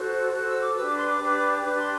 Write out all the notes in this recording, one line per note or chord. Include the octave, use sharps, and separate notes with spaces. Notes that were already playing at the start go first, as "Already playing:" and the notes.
Already playing: F#4 A4 C5 F#6
F#4 A4 C5 F#6
E6
D6
D4 G4 B4 E6
D6
C6
D6
D4 G4 B4
D4 G4 B4 D6
C6